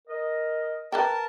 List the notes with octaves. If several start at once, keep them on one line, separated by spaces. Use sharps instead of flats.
A#4 D#5
A#4 B4 E5 G5 A5